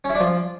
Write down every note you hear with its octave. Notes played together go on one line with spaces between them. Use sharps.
C#4
E4
D4
F3